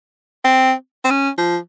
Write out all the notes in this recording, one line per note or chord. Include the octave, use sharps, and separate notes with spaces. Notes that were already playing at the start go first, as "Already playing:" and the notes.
C4
C4
C#4
F3